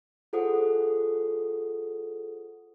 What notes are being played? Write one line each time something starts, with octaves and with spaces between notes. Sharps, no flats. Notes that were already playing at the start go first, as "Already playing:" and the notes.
F4 G#4 A4 C5 F#5 D#6